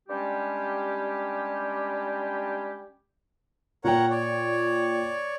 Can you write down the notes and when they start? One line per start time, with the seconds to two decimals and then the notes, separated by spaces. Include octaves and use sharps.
0.08 G3 G#3 C#4 D4 G4
3.84 A#2 A#4 C#5 F#5 G5
4.10 C#5 D5